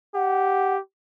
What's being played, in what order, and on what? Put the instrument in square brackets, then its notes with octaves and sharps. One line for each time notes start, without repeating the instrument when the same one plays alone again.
[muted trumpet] G4 [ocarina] F#5